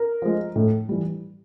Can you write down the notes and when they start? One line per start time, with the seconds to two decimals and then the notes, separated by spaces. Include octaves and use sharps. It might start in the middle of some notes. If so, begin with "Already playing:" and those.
Already playing: A#4
0.22 F3 G#3
0.56 A2
0.89 E3 G3